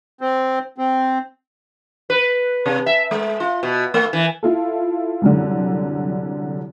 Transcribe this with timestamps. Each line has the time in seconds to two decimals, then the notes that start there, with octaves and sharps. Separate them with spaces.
0.21 C4
0.78 C4
2.10 B4
2.66 C3
2.86 E5
3.11 G#3
3.40 F4
3.63 B2
3.94 A3
4.13 E3
4.43 E4 F4 A4
5.21 C2 F#2 D3